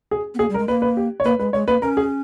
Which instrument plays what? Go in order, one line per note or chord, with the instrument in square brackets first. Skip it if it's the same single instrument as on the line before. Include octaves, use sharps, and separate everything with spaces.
[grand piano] G#4
[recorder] B3
[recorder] A#3 [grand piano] G#4
[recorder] G3
[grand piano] A#4
[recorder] G#3
[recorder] A#3 [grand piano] B4
[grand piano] B4
G4
C#5
[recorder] A#3 [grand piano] B4
[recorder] G#3 [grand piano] B4
[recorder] G#3 [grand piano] C#5
[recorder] A#3 [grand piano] B4
[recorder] C#4 [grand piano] A#4
[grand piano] G#4